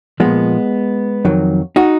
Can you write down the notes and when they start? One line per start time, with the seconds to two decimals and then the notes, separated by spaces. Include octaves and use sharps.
0.20 A#2 F3 G#3 B3
1.25 F2 D#3 F#3
1.76 D#4 F#4